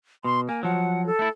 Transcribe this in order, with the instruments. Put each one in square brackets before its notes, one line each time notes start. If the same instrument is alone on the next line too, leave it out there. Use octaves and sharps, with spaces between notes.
[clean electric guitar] B2 [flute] C6
[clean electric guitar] A#3 [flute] G#5
[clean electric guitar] F3 F#3 [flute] F#5
[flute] A4
[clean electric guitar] A3 E4